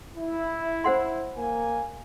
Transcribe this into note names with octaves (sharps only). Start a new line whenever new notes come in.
E4
C5 F#5 C6
A#3 G#5